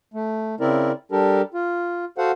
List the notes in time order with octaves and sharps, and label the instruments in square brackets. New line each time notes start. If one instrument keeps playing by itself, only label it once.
[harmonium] A3
C#3 C4 E4 A#4 D5
G3 D4 G4 A4 A#4
F4
F#4 A4 C5 F5 F#5